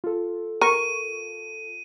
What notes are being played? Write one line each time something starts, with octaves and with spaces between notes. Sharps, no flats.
F4 A4
A#4 C#6 D#7